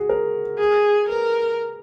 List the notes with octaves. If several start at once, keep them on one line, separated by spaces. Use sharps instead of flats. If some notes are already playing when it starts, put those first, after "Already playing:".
Already playing: F#4 G#4
A#4
G#4
A#4 B4